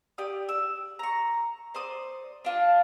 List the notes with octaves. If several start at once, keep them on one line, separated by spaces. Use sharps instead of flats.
G4 D5 D#6
E6
A#5 C#6
C5 D5 D#6
D4 F4 A5